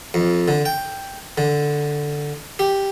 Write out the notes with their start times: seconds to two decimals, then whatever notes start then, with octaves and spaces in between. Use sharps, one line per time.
0.14 F2
0.48 D3
0.65 G5
1.38 D3
2.59 G4